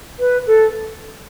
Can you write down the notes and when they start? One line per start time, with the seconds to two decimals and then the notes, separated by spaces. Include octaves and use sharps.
0.19 B4
0.46 A4